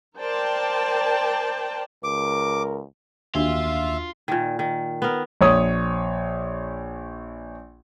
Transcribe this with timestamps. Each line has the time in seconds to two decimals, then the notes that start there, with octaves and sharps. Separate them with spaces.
0.18 A#4 C5 D5 G5 A5
2.04 C#2 A#4 D6
3.35 D#2 D4 F4 F#4 E5 C6
4.28 A#2 D#3
4.59 D#3
5.02 B3 A#4
5.41 A#1 C#5 D#6